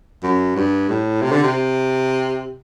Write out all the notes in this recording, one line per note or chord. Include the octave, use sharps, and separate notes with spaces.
F#2
G2
A2
C3
D3
C3